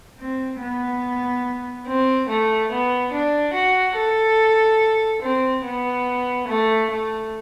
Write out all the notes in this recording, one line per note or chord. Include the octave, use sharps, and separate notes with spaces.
C4
B3
C4
A3
B3
D4
F#4
A4
C4
B3
A3
A3